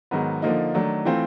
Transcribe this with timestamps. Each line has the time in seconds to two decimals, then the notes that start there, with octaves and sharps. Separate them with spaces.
0.11 G#2 D#3 F#3 B3
0.42 D3 F3 A#3 D#4
0.74 D#3 F#3 A3 D4
1.05 E3 A3 C4 F4